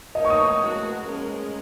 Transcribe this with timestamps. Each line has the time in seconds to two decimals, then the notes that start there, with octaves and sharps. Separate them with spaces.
0.15 A#3 D#4 A#4 C#5 D#5
0.25 C#6
0.30 D#6
0.46 D#6
0.61 G#3 F#4 A#4
1.08 G#3 C#4 A#4